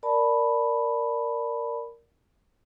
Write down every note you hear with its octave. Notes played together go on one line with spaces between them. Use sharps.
A#4 D5 A5 B5